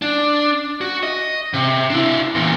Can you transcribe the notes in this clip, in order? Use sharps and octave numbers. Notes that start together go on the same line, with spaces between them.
D4
F#4
D#5
C3
D4 E4
E2 A#2